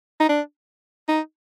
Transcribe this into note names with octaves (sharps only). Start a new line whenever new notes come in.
D#4
D4
D#4